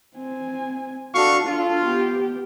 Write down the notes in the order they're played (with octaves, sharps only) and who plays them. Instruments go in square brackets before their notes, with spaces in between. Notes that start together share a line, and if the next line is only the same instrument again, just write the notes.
[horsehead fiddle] C4 G#5
[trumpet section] D4 F5 C#6 [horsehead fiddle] F#4 A4
[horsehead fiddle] D4 A4 [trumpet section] F4
[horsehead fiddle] B3 G4